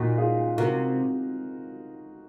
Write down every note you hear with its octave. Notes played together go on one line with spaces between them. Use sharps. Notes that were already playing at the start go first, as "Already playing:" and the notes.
Already playing: A#2 D#4 F#4
F4 G#4
C3 F#4 A#4